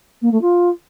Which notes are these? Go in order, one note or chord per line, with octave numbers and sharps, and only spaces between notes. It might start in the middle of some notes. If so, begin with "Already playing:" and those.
A#3
A3
F4